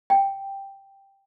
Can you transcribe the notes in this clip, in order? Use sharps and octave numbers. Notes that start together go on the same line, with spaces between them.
G5